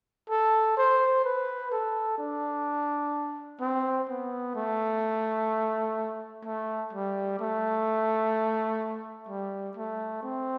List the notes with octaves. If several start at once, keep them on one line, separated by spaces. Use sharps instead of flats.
A4
C5
B4
A4
D4
C4
B3
A3
A3
G3
A3
G3
A3
C4